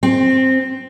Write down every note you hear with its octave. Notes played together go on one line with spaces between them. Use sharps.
C4